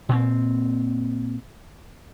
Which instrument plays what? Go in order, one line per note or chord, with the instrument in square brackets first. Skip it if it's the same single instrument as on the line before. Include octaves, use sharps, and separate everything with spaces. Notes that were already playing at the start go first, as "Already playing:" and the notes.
[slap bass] A#2 C4